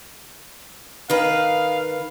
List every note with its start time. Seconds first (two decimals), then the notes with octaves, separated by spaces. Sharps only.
1.10 D#3 B4 F5